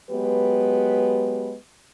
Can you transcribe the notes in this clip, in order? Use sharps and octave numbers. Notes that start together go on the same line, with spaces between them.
F#3 G#3 B3 G4 B4